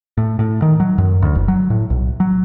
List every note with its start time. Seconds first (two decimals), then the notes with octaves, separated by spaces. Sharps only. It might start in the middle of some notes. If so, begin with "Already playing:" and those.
0.18 A2
0.39 A2
0.62 D#3
0.80 F#3
0.98 F#2
1.22 D2
1.35 F#1
1.48 F#3
1.70 A2
1.90 B1
2.20 F#3